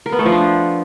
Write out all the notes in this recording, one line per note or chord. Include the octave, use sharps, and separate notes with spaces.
A#4
B3
A3
F3
D4